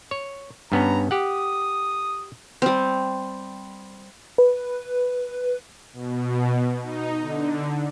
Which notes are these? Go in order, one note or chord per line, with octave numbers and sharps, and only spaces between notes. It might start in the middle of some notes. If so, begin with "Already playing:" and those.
C#5
G2 B3 C#4 A#5
G4 F#5 D#6
G3 C4
B4
B2
D#4
D3